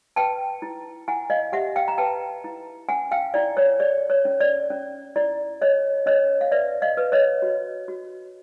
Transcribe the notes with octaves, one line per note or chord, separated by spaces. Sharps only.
B4 G5 A5
E4
E4 F#5 G#5
D#5 F5
G4 E5 F#5
F5 G5
A#5
B4 G5 A5
E4
C#4 F#5 G#5
F5 G5
E4 D5
C#5
G#4 D5
C#5
C#4
D5
C#4
E4 D5
G#4 C#5 D#5
C#4 C#5 D#5
F5
B4 D5 E5
D#5 F5
B4
C#5 D#5
F#4
F#4